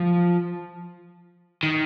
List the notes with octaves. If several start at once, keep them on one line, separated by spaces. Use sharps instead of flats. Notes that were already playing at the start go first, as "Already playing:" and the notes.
Already playing: F3
D#3